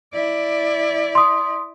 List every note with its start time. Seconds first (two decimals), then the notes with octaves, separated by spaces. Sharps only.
0.13 E4 D5
1.15 C6 D#6